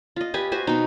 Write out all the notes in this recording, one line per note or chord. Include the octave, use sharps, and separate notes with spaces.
F4 D#5
G4 B4 G#5
F#4 C5 G#5
B2 D#4